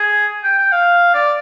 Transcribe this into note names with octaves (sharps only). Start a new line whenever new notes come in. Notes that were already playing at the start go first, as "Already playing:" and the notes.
Already playing: G#4
G5
G5
F5
D5